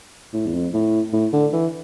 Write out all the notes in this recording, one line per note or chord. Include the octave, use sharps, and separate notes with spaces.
A2
E2
F2
A2
A2
D3
E3